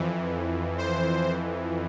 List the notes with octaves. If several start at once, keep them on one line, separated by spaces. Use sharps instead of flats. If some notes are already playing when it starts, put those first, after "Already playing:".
Already playing: F2 E3
C5